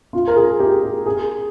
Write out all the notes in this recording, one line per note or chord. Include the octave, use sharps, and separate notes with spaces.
F4
A#4
G#4
G4
G4
G#4